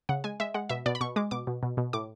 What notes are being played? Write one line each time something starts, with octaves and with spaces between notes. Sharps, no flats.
C#3 F#5
G#3 G#5
G#3 E5
G#3 F#5
B2 E5
B2 D5
B5
B2 C#6
G#3 D6
B2 D6
B2
B2
B2
A2 D6